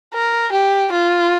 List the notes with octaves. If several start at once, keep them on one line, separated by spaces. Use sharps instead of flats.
A#4
G4
F4